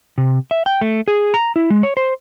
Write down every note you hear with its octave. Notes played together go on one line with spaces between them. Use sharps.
C3
E5
G5
A3
G#4
A#5
E4
G#3
C#5
C5